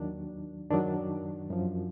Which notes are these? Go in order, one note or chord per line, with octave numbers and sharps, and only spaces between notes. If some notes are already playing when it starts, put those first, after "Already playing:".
Already playing: D#2 D#3 F#3 D4
F#2 D#3 F#3 D4
F#2 F3